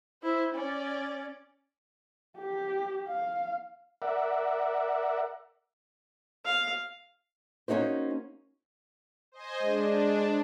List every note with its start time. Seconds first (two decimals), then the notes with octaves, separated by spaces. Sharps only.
0.22 E4 C5
0.54 C#4 D5
2.38 G4
3.08 F5
4.02 A#4 D5 E5 F#5
6.45 F5
7.68 A#3 C#4 D#4 F#4 C5
9.32 C5 D#5 G#5
9.63 G#3 D4